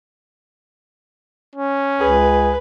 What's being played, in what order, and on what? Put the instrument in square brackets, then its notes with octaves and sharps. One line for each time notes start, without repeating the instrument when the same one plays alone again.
[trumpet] C#4
[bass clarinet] C#2 [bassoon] G#4 [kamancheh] B4